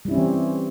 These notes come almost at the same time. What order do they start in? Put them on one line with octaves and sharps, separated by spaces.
G3 E4 C#4 C4 E3